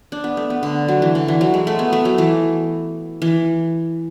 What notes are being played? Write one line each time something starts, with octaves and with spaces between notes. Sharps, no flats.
D4
B3
A3
B3
D3
F#3
E3
D3
E3
F#3
G#3
A3
B3
A3
F#3
E3
E3